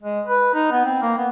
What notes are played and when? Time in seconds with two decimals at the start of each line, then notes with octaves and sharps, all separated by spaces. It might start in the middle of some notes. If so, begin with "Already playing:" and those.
0.02 G#3
0.27 B4
0.54 D#4
0.71 B3
0.85 C4
1.02 A#3
1.17 B3